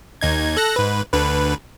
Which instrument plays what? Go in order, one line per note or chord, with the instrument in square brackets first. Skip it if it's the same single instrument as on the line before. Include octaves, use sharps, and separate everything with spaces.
[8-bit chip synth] D#2 D#4 G#6
A4 F#6 A#6
G#2 B4
D2 D3 B4